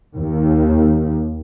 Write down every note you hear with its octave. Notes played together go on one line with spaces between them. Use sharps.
D#2